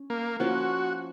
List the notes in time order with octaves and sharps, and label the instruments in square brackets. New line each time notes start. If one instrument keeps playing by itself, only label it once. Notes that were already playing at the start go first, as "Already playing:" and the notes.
Already playing: [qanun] C#4
[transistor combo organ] A#3
[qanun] F3 A#3 C#4 F4 [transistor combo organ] F#4